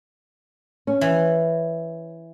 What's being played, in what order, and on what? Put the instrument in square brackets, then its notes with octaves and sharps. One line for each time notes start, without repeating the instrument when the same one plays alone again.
[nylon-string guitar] C#4
[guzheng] E3